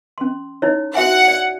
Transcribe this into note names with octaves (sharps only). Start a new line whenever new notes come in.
C#4 C6
D#4 E4 C#5
F#4 E5 F#5 G#5
D5